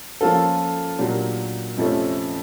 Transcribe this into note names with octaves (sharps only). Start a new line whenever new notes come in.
F3 A#3 C#4 F4 A4
A#2 F#3 A#3 D4 G4
F2 C3 F3 A3 C#4